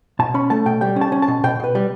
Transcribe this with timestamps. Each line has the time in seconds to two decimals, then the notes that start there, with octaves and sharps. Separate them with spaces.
0.19 B2 A5
0.34 C#4 B5
0.50 A3 A5
0.66 B2 G5
0.81 G3 G5
0.96 C#4
1.01 A5
1.12 C#4
1.22 A5
1.28 B2
1.44 B2 G5
1.60 B2 B4
1.75 G3